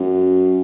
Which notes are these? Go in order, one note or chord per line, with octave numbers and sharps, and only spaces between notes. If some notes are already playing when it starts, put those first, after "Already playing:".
Already playing: F#2